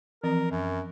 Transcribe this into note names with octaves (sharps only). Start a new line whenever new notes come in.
E3 F3 C4 A#4
F#2